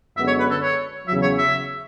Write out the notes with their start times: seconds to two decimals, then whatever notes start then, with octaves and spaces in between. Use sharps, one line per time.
0.16 F#2 D3 G#3 B3 E5
0.27 C#5
0.39 B4
0.51 A4
0.62 C#5
1.07 E2 C#3 F#3 E5
1.23 C#5
1.38 E5